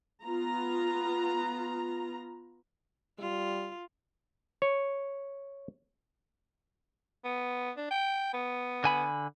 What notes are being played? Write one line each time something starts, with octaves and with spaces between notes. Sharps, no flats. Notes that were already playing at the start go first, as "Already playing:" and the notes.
B3 F4 A#5
G3 F4
C#5
B3
D4
G5
B3
D3 G#5 B5